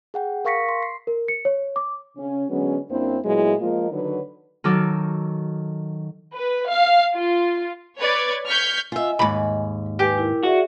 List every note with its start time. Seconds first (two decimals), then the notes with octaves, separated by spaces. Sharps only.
0.14 G#4 F#5 G5
0.45 A#4 F5 C#6 A#6 B6 C#7
0.69 C6
0.83 C7
1.07 A#4
1.28 C#7
1.45 C#5
1.76 D6
2.17 C#3 C#4
2.50 D3 F#3 G#3 B3 C#4
2.90 F#2 A#3 C4 D4 E4 C5
3.25 A#2 F#3 G#3 B3 E4
3.61 F3 G#3 A#3 F4 A#4 D#5
3.91 D3 D#3 F#3 D#4 B4 C#5
4.64 D#3 F#3 A4 D6 F6
6.35 B4
6.69 F5
7.18 F4
8.00 B4 C#5 D5 G#6 A6
8.46 C#6 F6 G6 G#6 B6
8.92 F4 D#5 E5 G#5
9.19 D#2 G#2 B5
9.99 G4 B4 G#5
10.18 E4 A#4
10.43 F#4 G#4 D5 E5